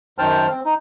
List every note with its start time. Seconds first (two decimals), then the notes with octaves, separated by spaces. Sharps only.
0.18 F#2 D#3 C5 G5 A5 F6
0.50 C4
0.65 D#4